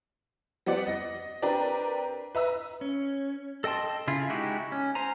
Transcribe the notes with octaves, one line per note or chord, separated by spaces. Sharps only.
G3 B3 C4 D5 F#5
D#5 A#6
C4 D4 G4 A#4 B4
B4 E5 A#5 E6
C#4
A4 D#5 G5 A5 C6
C#3 E4 F4
G#3 D#4 E4 F#4 G4
C#4
C5 G#5 A#5